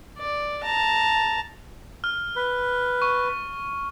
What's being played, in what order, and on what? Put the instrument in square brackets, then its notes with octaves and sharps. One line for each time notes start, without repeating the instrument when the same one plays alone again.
[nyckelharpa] D5
A5 A#5
[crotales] F6
[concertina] B4
[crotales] C#6